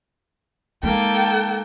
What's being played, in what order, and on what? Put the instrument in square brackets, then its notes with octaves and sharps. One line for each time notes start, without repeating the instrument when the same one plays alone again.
[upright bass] G#3 D#4 [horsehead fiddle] A#3 A4 [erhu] G5